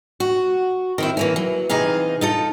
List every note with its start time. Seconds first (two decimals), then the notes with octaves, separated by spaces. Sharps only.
0.20 F#4
0.98 D#3 C4 E4
1.17 E3 A#3 C#4
1.36 F#3
1.69 C3 E3 D#4 G#4 F5
2.21 D#4 F4 A4